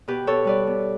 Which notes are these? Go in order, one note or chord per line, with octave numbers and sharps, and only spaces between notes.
B2 G4 B4
B2 A4 C#5
G3 B4 D5
B2